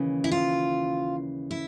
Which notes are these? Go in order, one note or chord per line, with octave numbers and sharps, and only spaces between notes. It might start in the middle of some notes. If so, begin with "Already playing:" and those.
Already playing: D#2 C#3 E3
E4
F4
E4